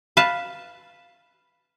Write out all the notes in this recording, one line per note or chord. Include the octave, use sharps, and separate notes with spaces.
B4 F5 A5